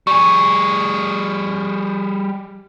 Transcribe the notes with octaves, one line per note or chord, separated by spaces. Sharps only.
G3 G#4 C#6